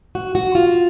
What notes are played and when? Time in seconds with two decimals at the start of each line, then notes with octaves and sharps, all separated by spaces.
0.15 F#4
0.35 F#4
0.55 F4